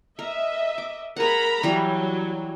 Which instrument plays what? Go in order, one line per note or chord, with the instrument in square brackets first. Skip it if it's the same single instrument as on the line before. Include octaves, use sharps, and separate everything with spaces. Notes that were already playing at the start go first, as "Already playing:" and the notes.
[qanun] A#4 [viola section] D#5 E5
[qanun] D6
[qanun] G#4 F#5 [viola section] A#4 A#5 B5
[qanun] E3 G3 [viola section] F#3